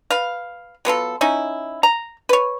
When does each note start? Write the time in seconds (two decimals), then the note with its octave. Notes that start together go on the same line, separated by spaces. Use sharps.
0.10 B4 F5
0.85 F#3 B3 F4 A4
1.21 C#4 D#4 E4
1.83 A#5
2.29 B4 C#5